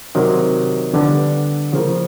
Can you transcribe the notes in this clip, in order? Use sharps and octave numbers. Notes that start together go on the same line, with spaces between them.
C3 D#3 F#3
D3 G3 B3 D4
C#3 F3 A#3